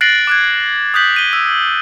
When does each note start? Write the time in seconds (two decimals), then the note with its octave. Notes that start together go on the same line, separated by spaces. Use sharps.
0.01 F#6 A6 A#6 C7 D7 F#7
0.27 D6 F#6 G#6
0.94 D#6 F#6 G6 B6 F#7
1.16 D#7 G7
1.33 E6